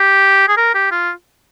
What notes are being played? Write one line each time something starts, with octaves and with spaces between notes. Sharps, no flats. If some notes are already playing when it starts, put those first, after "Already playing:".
Already playing: G4
G#4
A#4
G4
F4